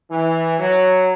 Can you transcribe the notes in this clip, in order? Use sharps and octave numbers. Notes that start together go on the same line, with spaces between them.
E3
F#3